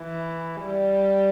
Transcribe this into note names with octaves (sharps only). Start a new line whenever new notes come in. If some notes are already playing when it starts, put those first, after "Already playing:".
Already playing: E3
G3